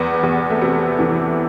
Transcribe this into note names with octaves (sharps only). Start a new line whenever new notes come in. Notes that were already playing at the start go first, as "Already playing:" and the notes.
Already playing: E2 B3
E2
A3
C3 B3
E3